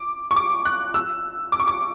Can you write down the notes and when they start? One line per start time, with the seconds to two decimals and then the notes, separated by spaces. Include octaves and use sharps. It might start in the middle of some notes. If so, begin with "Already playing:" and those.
Already playing: D6
0.31 C#6
0.36 D6
0.65 F#6
0.94 E6
1.52 D6
1.60 C#6
1.67 D6